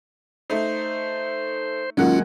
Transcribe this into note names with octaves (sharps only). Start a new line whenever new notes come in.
A3 D#4 C5
D#3 F#3 G#3 A#3 C#4 F4 F#5